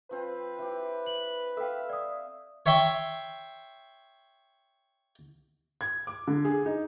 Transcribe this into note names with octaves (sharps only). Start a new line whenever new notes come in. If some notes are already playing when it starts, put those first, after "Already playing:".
F3 C4 B4
E3 G4
F#7
A4 E5 F5 G5
D5 D#6
C#5 E5 G5 C6 C#6
G#6
D6
D3
G#4
D#4